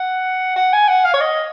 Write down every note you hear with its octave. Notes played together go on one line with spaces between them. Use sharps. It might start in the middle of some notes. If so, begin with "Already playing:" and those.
Already playing: F#5
F#5
G#5
F#5
F5
C#5
D#5